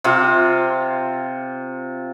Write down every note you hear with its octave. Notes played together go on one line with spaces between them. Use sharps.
C3 F4